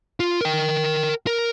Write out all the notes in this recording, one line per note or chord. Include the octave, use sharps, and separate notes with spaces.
F4
A#4 G5
A#4